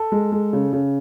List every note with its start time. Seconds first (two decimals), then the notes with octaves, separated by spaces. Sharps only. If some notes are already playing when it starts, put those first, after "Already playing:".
Already playing: A4
0.12 G#3
0.32 G#3
0.53 C#3
0.73 C#3